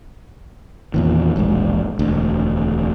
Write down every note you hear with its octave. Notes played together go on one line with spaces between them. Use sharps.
E2 A#2 D#3
E1 A#1 G#2 G#3
E1 D2